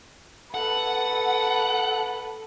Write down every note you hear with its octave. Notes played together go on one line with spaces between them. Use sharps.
A4 B4 F#5